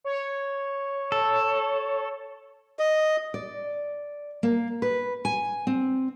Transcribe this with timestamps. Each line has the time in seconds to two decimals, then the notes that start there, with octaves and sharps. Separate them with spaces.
0.04 C#5
1.12 A4
2.79 D#5
3.34 D5
4.43 A#3
4.82 B4
5.25 G#5
5.67 C4